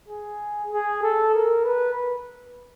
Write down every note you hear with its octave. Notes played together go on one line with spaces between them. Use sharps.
G#4
G#4
A4
A#4
B4